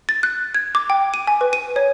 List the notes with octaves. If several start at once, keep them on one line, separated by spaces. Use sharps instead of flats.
A6
F#6
G#6
D6
G5
D#7
G#5
B4
D#7
C#5